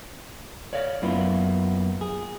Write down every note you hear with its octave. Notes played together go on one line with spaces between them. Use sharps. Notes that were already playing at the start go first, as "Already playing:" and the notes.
C#5 D5 F5
F#2 A#3 B3 E4 F4
G#4